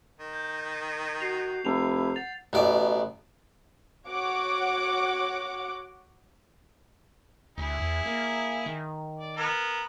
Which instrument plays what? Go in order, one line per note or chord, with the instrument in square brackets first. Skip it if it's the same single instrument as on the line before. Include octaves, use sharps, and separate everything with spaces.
[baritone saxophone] D#3
[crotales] G6
[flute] F#4 [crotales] C7 F7
[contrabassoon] F1 [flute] E4 [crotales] F7
[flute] F#5 [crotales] A6 F7
[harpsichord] A1 B2 D5
[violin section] F#4 C#5 F#5 D6
[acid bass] D2 [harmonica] E4 G#4
[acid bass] E2
A#3
D#3
[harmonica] D5
B3 A#4